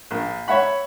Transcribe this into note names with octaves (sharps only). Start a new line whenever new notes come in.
A#1
C#5 E5 F#5 B5